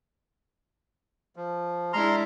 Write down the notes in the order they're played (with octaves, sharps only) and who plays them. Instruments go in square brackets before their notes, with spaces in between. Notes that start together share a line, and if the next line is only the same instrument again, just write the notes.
[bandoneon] F3
[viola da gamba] G#3 D4 E4 [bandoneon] A#5 C6 F6